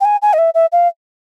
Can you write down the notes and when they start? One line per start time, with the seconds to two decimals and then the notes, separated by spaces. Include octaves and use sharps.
0.01 G5
0.05 G#5
0.22 G#5
0.33 D#5
0.38 E5
0.54 E5
0.72 F5